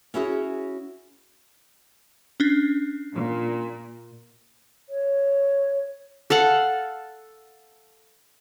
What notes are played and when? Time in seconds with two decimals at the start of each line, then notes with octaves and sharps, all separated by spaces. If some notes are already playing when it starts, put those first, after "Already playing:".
0.14 C#4 E4 F#4 G#4 C#5
2.40 C#4 D4
3.13 A#2
4.89 C#5
6.30 A4 F5 F#5